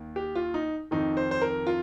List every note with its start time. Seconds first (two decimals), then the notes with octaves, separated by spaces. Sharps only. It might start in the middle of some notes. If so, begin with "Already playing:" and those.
Already playing: D#2 D#3
0.16 G4
0.35 F4
0.54 D#4
0.91 F2 D#3 D#4
1.17 C5
1.31 C5
1.41 A#4
1.67 F4